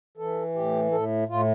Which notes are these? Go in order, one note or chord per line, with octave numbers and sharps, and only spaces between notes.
E3 A4
A2 G4
A2 A4
A2 F4